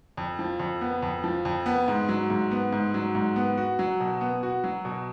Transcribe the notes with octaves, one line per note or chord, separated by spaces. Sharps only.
F2
F3
F2
B3
F2
F3
F2
B3
G#2
F#3
G#2
B3
G#2
F#3
G#2
B3
F#4
F#3
B2
B3
F#4
F#3
B2